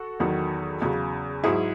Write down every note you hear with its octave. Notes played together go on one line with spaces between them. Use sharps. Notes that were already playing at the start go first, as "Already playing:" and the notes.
Already playing: F#4 A4
E2 D#3 F#3
E2 C#3 F#3
G#2 F#3 E4 G#4